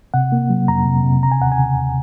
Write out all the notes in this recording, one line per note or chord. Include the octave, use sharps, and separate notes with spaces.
C3 F#5
A#3
F#3
F2 A#5
C3
C3
C#3 A#5
G#5
D#2 F#5
G#5
C#3
D#2